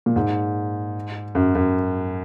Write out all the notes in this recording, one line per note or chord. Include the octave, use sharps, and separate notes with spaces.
A#2
G#2
F#2
F#2